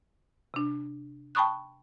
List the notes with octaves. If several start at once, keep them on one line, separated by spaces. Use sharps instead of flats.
C3 D4
G5 A5 B5 C#6 D#6 F#6